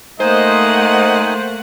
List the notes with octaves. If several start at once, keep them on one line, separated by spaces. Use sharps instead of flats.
A3 A#3 D#4 C5 D#5 F#5 G#5